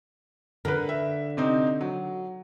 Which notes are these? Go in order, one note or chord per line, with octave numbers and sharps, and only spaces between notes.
D3 A#4 B4
E5
C3 C4 D#4
F#3